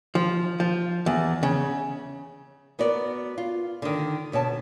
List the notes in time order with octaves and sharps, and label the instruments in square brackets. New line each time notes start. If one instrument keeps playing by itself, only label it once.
[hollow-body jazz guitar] F3
F3
E2
C#3
[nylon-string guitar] B3 F#4 A#4 D5
F4
D3 D#3
D2 B2 C#5 A5